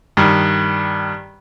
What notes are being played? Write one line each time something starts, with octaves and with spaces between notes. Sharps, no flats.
G2 D#3